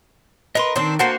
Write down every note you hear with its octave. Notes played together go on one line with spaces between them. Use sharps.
A#4 B4 D#5 C6
D#3 C4 D4
A#3 C4 F#4 A4 A#4 C5